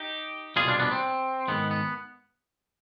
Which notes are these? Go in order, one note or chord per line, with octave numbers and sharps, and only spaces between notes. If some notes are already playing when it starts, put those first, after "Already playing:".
Already playing: D#4 G4
C2 B2 G3 F4 G#4
D4 F4
B3 D4
C4
G#2 D#3 G#3 B3
B3